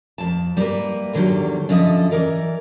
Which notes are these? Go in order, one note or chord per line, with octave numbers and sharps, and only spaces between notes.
F2 G#2 A5
G3 A#3 E4 A#4 B4
E2 D3 D#3 F#3 G3
F#2 D3 F3 A4 D#5 E5
E3 A#4 D5